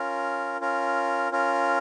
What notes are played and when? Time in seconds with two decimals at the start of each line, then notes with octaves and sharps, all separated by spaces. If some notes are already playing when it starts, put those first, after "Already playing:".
Already playing: C#4 F4 A#4
0.60 C#4 F4 A#4
1.31 C#4 F4 A#4